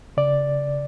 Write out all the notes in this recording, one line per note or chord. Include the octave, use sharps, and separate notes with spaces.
C#3 D5